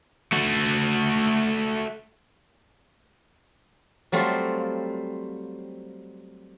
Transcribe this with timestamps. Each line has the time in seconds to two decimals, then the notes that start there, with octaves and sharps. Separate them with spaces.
0.32 A3 F#4
4.12 F#3 G3 A3 C4 F4